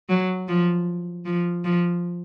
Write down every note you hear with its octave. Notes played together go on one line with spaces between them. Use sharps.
F#3
F3
F3
F3